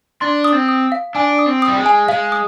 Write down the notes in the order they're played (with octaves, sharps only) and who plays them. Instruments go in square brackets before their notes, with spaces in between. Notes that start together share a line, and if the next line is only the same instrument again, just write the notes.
[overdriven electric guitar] D4 [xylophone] C6
[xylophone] D#6
[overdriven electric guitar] C4
[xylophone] D#6
F5
[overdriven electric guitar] D4 [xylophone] G#5
[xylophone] D#6
[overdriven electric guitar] C4
[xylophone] D#6
[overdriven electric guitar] G3
G#3
[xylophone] G#5
[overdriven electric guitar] G#3 [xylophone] F5
[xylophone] D#6